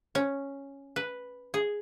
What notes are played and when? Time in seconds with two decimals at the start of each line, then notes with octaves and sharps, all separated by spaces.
0.15 C#4
0.96 B4
1.54 G#4